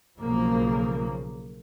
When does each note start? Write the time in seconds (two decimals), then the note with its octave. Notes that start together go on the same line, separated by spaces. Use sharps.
0.18 B1 C#3 F3 A#3